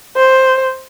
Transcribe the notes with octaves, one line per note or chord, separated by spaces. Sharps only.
C5